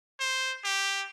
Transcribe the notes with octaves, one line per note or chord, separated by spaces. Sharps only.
C5
G4